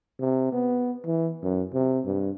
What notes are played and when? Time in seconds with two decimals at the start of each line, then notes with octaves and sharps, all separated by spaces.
0.19 C3
0.52 B3
1.06 E3
1.42 F#2
1.73 C3
2.05 G2